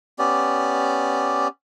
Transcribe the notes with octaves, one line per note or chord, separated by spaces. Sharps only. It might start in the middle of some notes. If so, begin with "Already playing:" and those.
B3 C#4 G4 D5